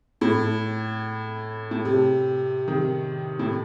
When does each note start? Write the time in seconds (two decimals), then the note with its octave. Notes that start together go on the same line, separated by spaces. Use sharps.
0.21 A2
1.71 A2
1.85 C3
2.68 C3 D#3
3.39 A2